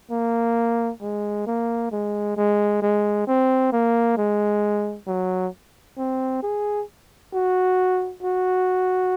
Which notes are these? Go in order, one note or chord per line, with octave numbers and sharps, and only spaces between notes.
A#3
G#3
A#3
G#3
G#3
G#3
C4
A#3
G#3
F#3
C4
G#4
F#4
F#4